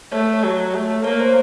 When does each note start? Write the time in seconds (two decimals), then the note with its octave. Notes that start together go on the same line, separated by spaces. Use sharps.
0.12 A3 C#5
0.33 C#5
0.44 F#3
0.74 A3
1.04 A#3 C#5
1.20 C5